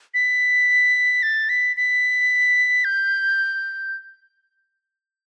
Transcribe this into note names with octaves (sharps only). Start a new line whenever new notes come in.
B6
A6
B6
B6
G6